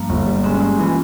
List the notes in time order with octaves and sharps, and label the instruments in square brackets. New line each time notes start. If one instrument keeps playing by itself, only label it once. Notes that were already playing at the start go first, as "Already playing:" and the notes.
Already playing: [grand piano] G2 [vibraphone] A#3
[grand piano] G1
G3
[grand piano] G#3 [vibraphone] C#4
[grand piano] G#3
[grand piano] E3 [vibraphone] F4